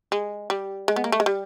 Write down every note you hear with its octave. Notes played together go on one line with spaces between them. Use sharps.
G#3
G3
G#3
B3
A#3
A3
G#3
G3